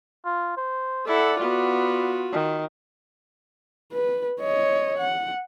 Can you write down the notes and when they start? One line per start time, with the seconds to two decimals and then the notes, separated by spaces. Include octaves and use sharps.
0.25 F4
0.57 C5
1.07 E4 A4 D5 F#5
1.40 B3 F4 F#4
2.32 D#3
3.93 B4
4.41 C#5 D#5
4.98 F#5